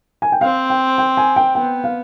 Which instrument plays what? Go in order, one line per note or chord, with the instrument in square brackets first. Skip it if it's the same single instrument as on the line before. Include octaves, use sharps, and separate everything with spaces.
[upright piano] G#5
G5
[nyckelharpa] C4 [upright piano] F5
[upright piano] G5
G5
G#5
G5
[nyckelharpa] B3 [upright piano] G5
[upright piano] F5